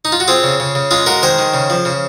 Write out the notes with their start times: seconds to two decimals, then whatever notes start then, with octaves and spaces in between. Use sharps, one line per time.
0.05 D#4
0.12 F4
0.20 F#4
0.28 C4 F4 G#4
0.43 C#3
0.60 C#3
0.75 C#3
0.91 G#3 F4 G#4
1.06 G#3 F#4 A#4
1.22 D#3 G#4 C5
1.39 D#3
1.54 C#3
1.70 F3
1.85 C#3